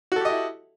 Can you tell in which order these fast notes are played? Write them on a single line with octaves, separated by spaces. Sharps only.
F#4 A4 G4 D#5 E4